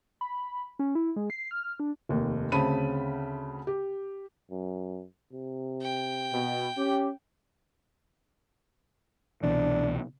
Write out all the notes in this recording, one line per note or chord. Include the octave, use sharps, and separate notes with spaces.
B5
C#4
E4
G#3
C7
F6
D4
F1 D#2
D2 C#3 C4 A5 B5 D#7
G4
F#2
C3
G5
B2
C#4 G4
C2 B2 E3 D4